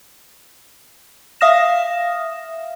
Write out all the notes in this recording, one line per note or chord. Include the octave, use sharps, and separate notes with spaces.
E5 F5 D#6 F6 A#6 E7